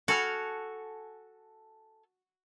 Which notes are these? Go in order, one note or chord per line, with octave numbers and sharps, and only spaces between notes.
F#4 A4 G#5 F6